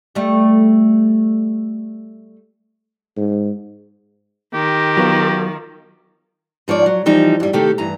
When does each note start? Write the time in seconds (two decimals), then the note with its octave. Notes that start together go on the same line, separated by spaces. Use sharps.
0.15 G3 A3
3.17 G#2
4.54 D#3 G4
4.97 F#3 B3 F4
6.68 G#2 F3 C#5 D5
6.86 F#3
7.06 E3 F3 G3 D#4
7.40 G2 G3
7.53 C3 D#3 A3 G4 A4
7.78 G2 E3 A#5